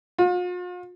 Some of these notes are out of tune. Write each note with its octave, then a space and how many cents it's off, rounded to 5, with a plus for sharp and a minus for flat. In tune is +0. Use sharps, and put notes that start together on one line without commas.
F4 +45